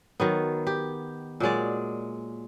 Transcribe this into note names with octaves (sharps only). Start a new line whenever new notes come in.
D#3 F#3 B3
G4
A#2 F#3 G#3 D5